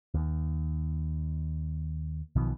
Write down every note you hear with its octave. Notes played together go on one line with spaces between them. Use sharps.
D#2
B1 B2 D#3 F3